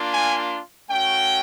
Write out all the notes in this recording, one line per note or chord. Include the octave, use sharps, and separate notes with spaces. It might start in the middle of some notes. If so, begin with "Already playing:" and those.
Already playing: A#3 D4 F4
G#5
A3 C#4 F#4 G5